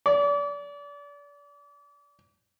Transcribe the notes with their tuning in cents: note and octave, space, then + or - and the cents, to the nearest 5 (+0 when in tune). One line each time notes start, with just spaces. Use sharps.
D5 -35